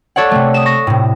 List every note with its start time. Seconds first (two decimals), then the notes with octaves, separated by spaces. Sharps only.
0.16 A4 C#5 D5 F#5
0.31 C3 A3
0.54 D#6 E7
0.65 C#6 A#6
0.87 A2 C3